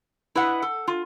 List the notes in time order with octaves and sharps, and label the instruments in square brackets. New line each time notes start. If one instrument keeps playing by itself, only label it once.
[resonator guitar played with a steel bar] E4 B4 D#5 E5 F#5
A4
F4